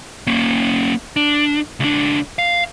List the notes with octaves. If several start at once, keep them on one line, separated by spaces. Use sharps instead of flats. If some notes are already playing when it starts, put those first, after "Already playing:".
A#3 C#4
D4
C#2 D4
F5